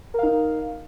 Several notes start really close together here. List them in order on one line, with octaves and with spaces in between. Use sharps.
A#4 F5 D#4